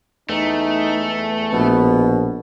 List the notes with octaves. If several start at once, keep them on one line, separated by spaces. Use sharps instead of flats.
E2 A3 D#4
A#1 B2 B3